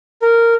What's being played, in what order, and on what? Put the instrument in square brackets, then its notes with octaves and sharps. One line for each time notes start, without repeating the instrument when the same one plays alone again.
[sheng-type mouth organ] A#4